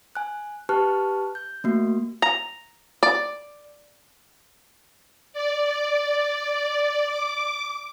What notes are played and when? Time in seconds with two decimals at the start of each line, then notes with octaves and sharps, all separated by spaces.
0.15 G#5 F#6
0.69 G4 B4 A5 C#6 F6 F#6
1.35 G6
1.64 A3 A#3 F#4
2.22 A#5
3.03 D5
5.33 D5
7.06 D6